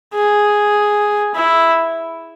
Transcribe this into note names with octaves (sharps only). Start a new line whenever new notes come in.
G#4
E4